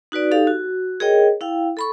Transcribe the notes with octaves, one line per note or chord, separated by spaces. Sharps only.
D#4 F#4 B4 D5
D#4 G4 A4 F5
F#4
G#4 A#4 C#5 D#5 G5
E4 F5 G5
A4 B5 C#6